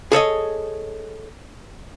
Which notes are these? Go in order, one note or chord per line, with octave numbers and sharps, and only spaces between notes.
G#4 A4 C#5 D#5